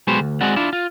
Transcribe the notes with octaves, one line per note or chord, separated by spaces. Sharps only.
B1 G#3 B3 F#4 G4 C5
D2
G#3 C4 F#4 D5 F#5
D4 E4 F4
F4